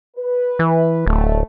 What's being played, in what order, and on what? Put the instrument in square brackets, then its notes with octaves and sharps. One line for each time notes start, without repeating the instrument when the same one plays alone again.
[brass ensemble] B4
[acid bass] E3
[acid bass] D1 [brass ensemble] A3